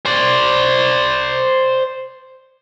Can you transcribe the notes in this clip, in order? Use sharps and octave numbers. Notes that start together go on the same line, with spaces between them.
C5 D5